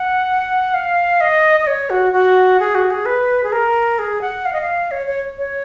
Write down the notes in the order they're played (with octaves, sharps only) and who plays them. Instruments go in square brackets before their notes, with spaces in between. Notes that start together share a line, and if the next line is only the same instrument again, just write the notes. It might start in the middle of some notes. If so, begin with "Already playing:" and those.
Already playing: [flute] F#5
F5
D#5
D#5
C#5
F#4
F#4
G#4
F#4
G#4
B4
G#4
A#4
G#4
F#5
F5
D#5
F5
C#5
C#5
C#5